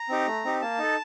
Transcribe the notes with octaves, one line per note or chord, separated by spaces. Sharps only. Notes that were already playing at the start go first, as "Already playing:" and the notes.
Already playing: A#5
C4 D#4 G4
A3
C4 D#4 G4
A#3 A5
D#4 A4